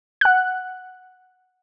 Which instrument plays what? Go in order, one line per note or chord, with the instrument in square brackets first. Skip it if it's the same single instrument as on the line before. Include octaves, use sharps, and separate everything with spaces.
[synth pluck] F#5 F#6